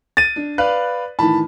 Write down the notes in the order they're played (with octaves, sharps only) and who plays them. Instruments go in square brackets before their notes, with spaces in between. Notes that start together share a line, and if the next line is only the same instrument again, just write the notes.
[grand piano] A6 D#7
[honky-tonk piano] D4
[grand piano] B4 D5 F5 [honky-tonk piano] F#6
[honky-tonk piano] A2 D#3 E3 [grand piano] A5 B5